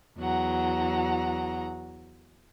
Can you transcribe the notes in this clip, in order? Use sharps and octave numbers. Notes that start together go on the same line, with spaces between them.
E2 F#3 F#5 A#5